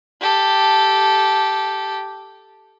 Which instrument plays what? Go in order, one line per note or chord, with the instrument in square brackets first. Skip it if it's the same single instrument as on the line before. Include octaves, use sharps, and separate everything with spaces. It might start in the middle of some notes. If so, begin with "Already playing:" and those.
[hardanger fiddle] G4 A4